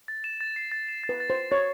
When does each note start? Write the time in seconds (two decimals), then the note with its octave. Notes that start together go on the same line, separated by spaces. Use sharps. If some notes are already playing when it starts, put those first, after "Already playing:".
0.08 A6
0.24 E7
0.41 A6
0.56 C7
0.72 A6
0.89 E7
1.03 A6
1.09 B4
1.20 A6
1.30 C5
1.35 E7
1.51 C#5 A6